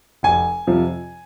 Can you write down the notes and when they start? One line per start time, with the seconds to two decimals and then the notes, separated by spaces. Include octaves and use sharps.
0.23 F1 G#5
0.67 F2 C3 F3